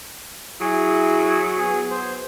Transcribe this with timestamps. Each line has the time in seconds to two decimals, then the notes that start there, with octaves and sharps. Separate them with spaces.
0.61 F#3 E4 G#4
1.58 B3 G#4
1.91 C5